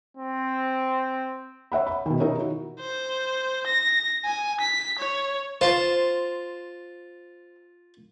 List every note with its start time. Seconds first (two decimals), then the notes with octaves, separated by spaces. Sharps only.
0.17 C4
1.72 C#5 E5 F#5 B5
1.86 B5
2.06 B2 D#3
2.20 D#4 E4 G4 A#4 C#5
2.39 E3 F#4
2.80 C5
3.67 A#6
4.25 G#5
4.60 B6
4.99 C#5
5.61 F4 C5 A5